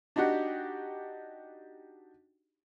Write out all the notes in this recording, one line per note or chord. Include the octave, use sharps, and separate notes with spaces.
D4 D#4 F#4 G4 F#5